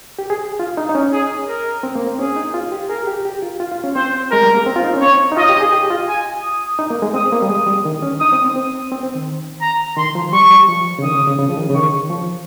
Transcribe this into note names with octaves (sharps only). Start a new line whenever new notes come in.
G4
G#4
F4
D#4
D#4
C#4
G#4
A#4
C4
A#3
C4
C#4 G#4
D#4
F4
G4
G#4 A#4
G4
G4
F4
F4
F4
C#4
C4 C5
G#3 A#4
G3
A#3
C4
F4
D#4
C#4
C4 C#5
D#4
F4 D#5
G4
G#4
G4
F4
G#5
D#6
D#4
A#3
G#3
C4 D#6
A#3
G3
G#3 D#6
G3
D#3
C#4
D#4 D#6
C4
C4
C4
C4
C4
D#3
A#5
D#3 C6
F3
G3 C#6
G3
F3
C#3
D#3 D#6
C#3
C#3
C#3
F3
D#3
C#3
D#3 C#6
F3